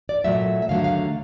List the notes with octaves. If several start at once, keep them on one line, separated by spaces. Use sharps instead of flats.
D5
A#2 F#3 A3 E5
E5
D#2 D3 F#3 A3 F5
F5